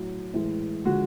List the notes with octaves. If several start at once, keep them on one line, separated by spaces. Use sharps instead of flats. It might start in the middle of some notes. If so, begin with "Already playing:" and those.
Already playing: A2 F#3
A2 E3 G#3
D3 F3 G#3 F#4